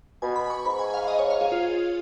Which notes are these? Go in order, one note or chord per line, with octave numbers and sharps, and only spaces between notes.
B2 G#5
B5
C#6
G#2 B5
G#5
F5
D#5
C#5
F5
G#4
F4